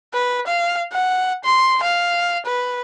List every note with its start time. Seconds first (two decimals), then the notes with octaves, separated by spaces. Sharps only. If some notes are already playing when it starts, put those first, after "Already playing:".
0.14 B4
0.47 F5
0.93 F#5
1.44 C6
1.83 F5
2.46 B4